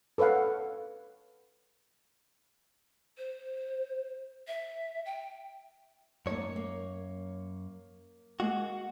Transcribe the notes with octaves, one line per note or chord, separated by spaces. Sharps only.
A4 B4 C#5 F5 F#5
C5
E5
G5
F#2 A#3 D#4 C#5 A5
A#3
G#3 A#3 F#4 D#5